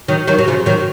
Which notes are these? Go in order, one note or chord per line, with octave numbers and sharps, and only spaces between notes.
D#3 F#3
D#3 F#3
F#3
C#3 F3
D#3 F#3